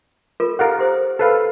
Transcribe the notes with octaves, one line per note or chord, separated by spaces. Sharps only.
F4 A4 A#4
G4 A4 A#4 F5 F#5
G4 C5 D#6
A4 B4 F5